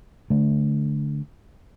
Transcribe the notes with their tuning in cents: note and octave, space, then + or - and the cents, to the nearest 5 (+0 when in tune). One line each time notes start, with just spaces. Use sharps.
D3 -15 A3 -25